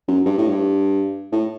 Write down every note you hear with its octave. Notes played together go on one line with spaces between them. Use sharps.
F#2
G2
A2
G2
A2